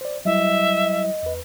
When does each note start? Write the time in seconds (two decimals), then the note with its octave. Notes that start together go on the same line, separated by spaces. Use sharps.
0.01 C5 D5
0.25 F#3 G3 E4 D#5 E5
1.23 E2 B4